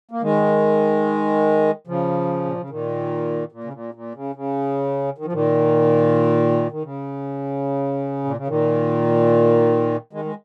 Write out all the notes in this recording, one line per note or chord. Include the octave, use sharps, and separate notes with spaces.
A#3
D#3 G#3
C#3 F3
A#2
C#3
A#2 D#3
A#2
C#3
A#2
A#2
C#3
C#3
D#3
F3
A#2 D#3
D#3
C#3
A#2
C#3
A#2 D#3
D#3 G#3
G#3